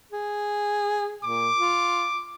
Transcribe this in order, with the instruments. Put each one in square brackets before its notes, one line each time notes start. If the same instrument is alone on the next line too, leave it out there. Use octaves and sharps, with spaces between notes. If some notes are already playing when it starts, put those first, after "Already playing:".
[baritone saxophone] G#4
[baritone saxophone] A#2 [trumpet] D6
[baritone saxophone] F4